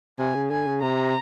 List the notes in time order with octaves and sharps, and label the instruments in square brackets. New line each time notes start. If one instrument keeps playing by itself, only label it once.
[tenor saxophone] C3 [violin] G#5
[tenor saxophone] C#3
[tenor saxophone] D3 [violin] G#5
[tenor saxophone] C#3
[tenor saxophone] C3 [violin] A#5